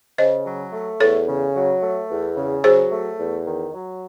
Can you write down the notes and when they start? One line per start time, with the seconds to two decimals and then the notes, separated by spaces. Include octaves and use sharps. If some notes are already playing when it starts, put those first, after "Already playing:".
0.18 C#3 C5 D#5
0.45 F#3
0.73 A3
1.00 E2 A4 C#5
1.28 C#3
1.55 F#3
1.83 A3
2.10 E2
2.36 C#3
2.64 F#3 G#4 C5
2.92 A3
3.19 E2
3.46 D#3
3.74 F#3